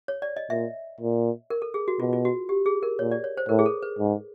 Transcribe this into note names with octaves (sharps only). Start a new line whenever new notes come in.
C#5
D5
D#5
A#2 E5
A#2
A#4
A4
G#4
F#4
B2 F4
F4
F#4
G4
G#4
A#4
A#2 C#5
D5
C#5
C5
A2 A#4
G#4
A4
B4
G#2